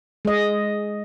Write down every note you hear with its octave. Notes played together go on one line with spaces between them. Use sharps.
G#3 D#5